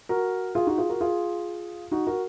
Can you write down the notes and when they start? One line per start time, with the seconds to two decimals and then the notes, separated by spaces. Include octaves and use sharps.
0.09 F#4 A#4
0.55 F4 G#4
0.67 D#4 F#4
0.78 F4 G#4
0.89 F#4 A#4
1.01 F4 G#4
1.92 D#4 F#4
2.07 F#4 A#4